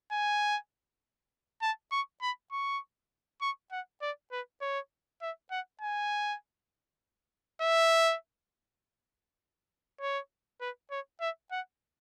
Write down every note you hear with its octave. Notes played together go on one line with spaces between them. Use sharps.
G#5
A5
C#6
B5
C#6
C#6
F#5
D5
B4
C#5
E5
F#5
G#5
E5
C#5
B4
C#5
E5
F#5